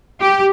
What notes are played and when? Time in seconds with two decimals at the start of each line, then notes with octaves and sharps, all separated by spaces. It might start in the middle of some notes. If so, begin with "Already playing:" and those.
0.21 G4